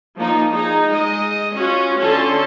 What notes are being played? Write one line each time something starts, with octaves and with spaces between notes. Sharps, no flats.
F3 A#3 D#4
D#4 G#4
G#3 D#5
C#4 F4 F#4
D3 C#4 A4 A5 C6